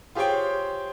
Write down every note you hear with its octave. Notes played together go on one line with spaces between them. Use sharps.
F4 G4 G#4 C5 C#5 G5